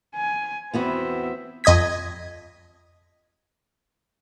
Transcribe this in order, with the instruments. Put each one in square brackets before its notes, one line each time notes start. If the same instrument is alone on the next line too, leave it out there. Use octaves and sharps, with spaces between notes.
[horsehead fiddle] G#5
[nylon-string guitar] E2 B3 F#4 [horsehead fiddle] C4 E5
[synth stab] F2 D#5 D#6 G#6 B6